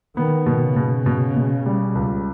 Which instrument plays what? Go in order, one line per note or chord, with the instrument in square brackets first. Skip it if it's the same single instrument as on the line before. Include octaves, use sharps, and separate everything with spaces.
[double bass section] D#3 [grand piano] B3
[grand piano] B2
[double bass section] C#3
[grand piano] B2
B2
B2
G3
C#2